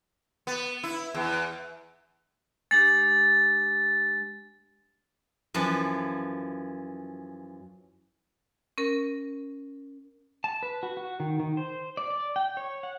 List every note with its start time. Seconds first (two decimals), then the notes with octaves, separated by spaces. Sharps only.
0.47 B3
0.83 E4
1.14 E2
2.71 G#3 D4 G4 A6
5.54 F#2 E3 F3 B4
8.78 C#4 A#4
10.44 A5
10.63 B4
10.83 F#4
10.97 F#4
11.20 D#3
11.40 D#3
11.57 C5
11.97 D5
12.10 D5
12.36 G5
12.57 C#5
12.83 F#5